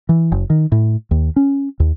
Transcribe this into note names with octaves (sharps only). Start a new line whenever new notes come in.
E3
F#1
D#3
A2
D#2
C#4
D#2